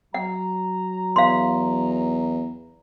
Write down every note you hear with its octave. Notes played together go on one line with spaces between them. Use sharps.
F#3 F#5 A#5
E2 F5 C6